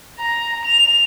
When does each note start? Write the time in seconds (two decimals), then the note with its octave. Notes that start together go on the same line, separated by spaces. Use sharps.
0.19 A#5
0.65 F7